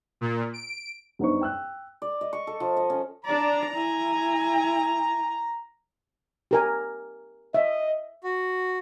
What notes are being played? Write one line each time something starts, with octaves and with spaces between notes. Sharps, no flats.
A#2
D7
G2 B3 D#4 C5 C#6
G5 E6 F#6
D5
D#5
C#6
A4
F3
D#5
C#4
D4 D5 A#5
E4 G#5
G4 A#4 G#5
D#5 E5
F#4